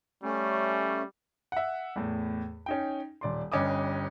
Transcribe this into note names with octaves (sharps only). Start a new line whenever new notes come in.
G3 A3 C#4
E5 F#5
E2 A2
C#4 D#4 G5
D#1 D5 C6
G1 G2 C#4 D#5 D6 D#6